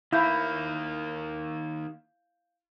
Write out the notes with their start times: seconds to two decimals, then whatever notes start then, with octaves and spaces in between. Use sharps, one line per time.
0.13 D#3 A#3 E4 F5 G6